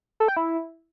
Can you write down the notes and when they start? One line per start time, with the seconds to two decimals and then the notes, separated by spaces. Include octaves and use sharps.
0.20 A4
0.28 G5
0.37 E4